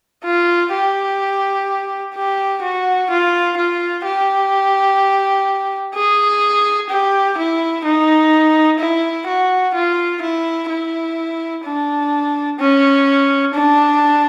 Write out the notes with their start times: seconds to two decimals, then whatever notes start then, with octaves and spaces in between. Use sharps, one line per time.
0.25 F4
0.73 G4
2.15 G4
2.63 F#4
3.11 F4
3.58 F4
4.05 G4
5.95 G#4
6.90 G4
7.38 E4
7.85 D#4
8.79 E4
9.28 F#4
9.75 F4
10.22 E4
10.70 E4
11.65 D4
12.59 C#4
13.54 D4